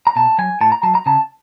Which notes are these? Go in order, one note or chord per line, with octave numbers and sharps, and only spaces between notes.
A#5
B2 A5
F#3 G#5
A2 A5
A#5
F#3 A5
A#5
C#3 A5